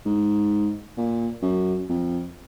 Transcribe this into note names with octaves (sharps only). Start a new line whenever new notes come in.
G#2
A#2
F#2
F2